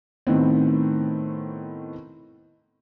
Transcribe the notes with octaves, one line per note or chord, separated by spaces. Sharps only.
A2 D#3 B3 C4